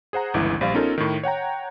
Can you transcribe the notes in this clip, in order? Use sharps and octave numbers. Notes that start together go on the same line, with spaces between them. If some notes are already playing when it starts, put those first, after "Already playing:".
G#4 C5 F#5 A#5
G1 C#2 E3 E4
A#1 G3 C5 D5 F5
B3 C#4 D#4 F4 A4 A#4
A2 D#3
C#5 F#5 G5 A#5